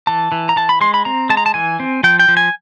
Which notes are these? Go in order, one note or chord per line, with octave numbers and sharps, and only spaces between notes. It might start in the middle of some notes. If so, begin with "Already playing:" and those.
E3 A5
E3
A#5
E3 A5
B5
G#3 C6
B5
C4 A#5
G#3 A5
A#5
A5
E3 G#5
C4
F3 G5
G5
F3
G#5